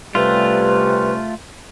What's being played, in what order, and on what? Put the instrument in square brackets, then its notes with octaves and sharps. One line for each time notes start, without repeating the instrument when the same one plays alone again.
[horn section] C3 G3 C#4 [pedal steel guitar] A3 F4 [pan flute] B4